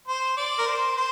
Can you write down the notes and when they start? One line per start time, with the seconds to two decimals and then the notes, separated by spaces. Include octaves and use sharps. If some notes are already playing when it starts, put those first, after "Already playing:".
0.08 C5
0.37 D5
0.59 A#4
0.66 C5
0.97 C5